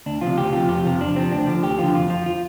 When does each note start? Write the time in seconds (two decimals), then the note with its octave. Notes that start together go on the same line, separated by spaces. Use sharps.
0.06 D2 D4
0.21 C3 F3 F4
0.38 D2 G4
0.53 C3 F3 F4
0.69 F2 G4
0.84 C3 F3 F4
1.00 F2 D4
1.16 C3 F3 C4
1.32 D2 D4
1.47 D3 F3
1.63 D2 G4
1.79 D3 F3 F4
1.94 F2 F4
2.10 F3 F4
2.26 F4